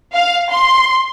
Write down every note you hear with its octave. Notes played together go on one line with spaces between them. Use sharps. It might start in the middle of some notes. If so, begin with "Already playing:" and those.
F5
C6